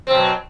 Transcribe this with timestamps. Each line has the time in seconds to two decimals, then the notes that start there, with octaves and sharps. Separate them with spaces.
0.07 C4
0.11 B2
0.15 F#3